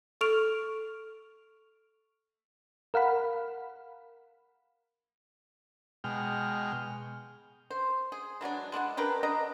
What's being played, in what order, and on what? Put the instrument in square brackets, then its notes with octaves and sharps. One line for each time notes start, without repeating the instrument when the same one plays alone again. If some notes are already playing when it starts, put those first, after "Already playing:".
[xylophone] A4 C#6 F6 D7 F7
[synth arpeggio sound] A#4 F5 F#5 B5
[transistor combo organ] B2 G#3 G5 F6
[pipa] C5
G#4
E3 F#3 G#3 D4
G#3 D4 E4 F#5
D4 G4 A#4 B4
D4 D#5 A#5